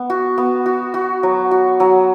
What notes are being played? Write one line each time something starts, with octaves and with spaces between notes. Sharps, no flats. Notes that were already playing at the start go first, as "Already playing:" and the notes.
Already playing: B3
F#4
B3
F#4
F#4
F#3
F#4
F#3